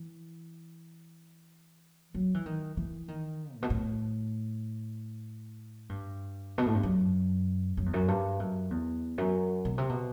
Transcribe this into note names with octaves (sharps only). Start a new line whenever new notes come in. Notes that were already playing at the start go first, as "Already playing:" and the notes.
Already playing: E3
F#3
E3
D#3
E3
D#3
A2
B2
A2
G2
B2
A2
G2
F#2
F#2
E2
F#2
G2
F#2
E2
F#2
B2
C3
B2